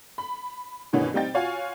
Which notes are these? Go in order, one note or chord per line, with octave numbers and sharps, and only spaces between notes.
B5
G2 B2 D#3 E3 B3 C#4
G3 C4 D#4 G5 A6
F4 F#4 C#5 F5 G#5